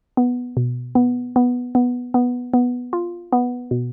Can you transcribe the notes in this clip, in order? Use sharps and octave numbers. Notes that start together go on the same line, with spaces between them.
B3
B2
B3
B3
B3
B3
B3
F4
B3
B2